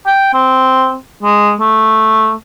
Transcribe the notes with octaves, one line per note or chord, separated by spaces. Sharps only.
G5
C4
G#3
A3